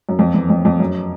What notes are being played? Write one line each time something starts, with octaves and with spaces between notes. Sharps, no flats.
F#2
F2
E2
F2
F2
F#2